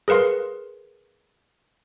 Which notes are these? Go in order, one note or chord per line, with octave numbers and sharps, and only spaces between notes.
G#4 A#4 B4 F5 C6